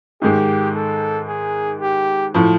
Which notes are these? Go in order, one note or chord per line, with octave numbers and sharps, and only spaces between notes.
G#2 D#3 G#3 G4
A4
G#4
G4
A2 F3